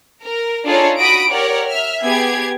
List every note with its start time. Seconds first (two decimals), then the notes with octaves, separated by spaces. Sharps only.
0.24 A#4
0.66 D4 D#4 F4 G#4 A4 C#5
0.99 F#4 B5 D#6 A#6 D7
1.30 G4 A#4 C#5 D5 F#5
1.67 E5 F6
2.04 B3 G4 G#4 G#6